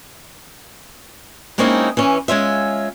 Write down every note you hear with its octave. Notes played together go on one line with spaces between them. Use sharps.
G#3 A#3 C4 C#4 D#4 E4
E3 C#4
G#3 C#4 F4 E5